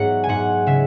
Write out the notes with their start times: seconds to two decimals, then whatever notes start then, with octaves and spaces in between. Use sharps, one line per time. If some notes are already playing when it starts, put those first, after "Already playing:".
Already playing: G#2 F#3 B3 D5 E5 F#5
0.24 G#5
0.29 G#2 F#5
0.66 C#3 E5